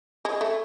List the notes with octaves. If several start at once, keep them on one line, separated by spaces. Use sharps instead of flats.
G#3
A3